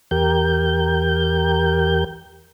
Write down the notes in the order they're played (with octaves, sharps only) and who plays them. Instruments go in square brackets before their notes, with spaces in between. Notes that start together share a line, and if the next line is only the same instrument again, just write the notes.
[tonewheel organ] E2 G4 A#4 G6